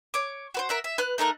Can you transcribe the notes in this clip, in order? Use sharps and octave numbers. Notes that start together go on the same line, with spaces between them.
C#5 D6
F#4 B4 C5
A#4 E5 F#5
E5
B4 F6 F#6
A3 D#4 A#4 F#6